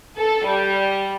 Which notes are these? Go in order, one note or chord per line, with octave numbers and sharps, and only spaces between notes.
A4
G3